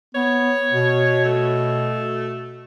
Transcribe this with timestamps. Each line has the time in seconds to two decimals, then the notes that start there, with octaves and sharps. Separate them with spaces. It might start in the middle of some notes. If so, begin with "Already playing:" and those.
0.15 B3 C#5
0.72 B2
1.25 A3